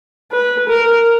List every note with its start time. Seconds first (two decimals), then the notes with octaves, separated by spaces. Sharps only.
0.32 B4
0.69 A#4